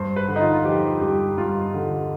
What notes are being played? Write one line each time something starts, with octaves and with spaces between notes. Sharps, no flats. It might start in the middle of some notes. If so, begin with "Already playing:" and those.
Already playing: G2 C5
B4
D3
D#4
F4
F4
F3 G4
G2 G4
G2 F4
D3